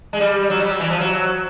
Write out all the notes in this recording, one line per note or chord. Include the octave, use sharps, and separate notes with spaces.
G#3
G3
F#3
G3
E3
F3
F#3